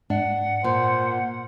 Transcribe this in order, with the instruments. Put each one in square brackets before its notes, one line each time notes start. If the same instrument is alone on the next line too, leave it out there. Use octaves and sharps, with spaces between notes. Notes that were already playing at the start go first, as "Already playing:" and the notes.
[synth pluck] G#2 [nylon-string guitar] D4 [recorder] F#5
[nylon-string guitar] A#2 [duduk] C5